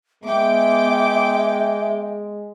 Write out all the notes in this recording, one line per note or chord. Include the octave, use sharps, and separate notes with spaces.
G#3 B3 E5 G5 D6